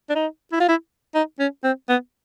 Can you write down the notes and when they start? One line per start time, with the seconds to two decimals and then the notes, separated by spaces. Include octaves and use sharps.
0.10 D4
0.15 D#4
0.52 E4
0.60 F4
0.68 E4
1.15 D#4
1.40 C#4
1.64 C4
1.89 B3